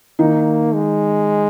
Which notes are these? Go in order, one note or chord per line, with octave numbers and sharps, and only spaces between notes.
D#3 A#3 D#4
G#3